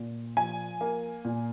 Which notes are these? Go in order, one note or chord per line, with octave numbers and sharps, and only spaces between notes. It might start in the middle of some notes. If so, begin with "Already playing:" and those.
Already playing: A#2
F3 G#5
A#3
A#2